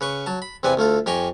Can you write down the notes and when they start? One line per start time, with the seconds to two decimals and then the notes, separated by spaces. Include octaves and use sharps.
0.01 C#3 B4 C#6
0.26 F#3 A5
0.42 B5
0.63 E2 C3 C4 B4 D5 G#5
0.77 D2 A3 F4 A4
1.06 F2 G4 G5 G#5 A#5 C#6